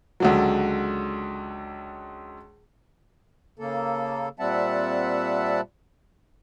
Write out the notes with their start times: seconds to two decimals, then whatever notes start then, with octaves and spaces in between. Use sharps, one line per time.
0.20 C#2 D3 F#3
3.59 C#3 A#3 A4
4.39 A#2 G3 C4 E5 F#5 A5